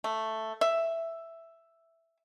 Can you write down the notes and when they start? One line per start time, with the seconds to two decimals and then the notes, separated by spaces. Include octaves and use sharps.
0.04 A3
0.61 E5